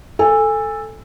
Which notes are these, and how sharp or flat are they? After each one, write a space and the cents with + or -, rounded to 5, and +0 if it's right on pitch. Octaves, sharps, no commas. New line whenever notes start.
A4 +0 G#5 -20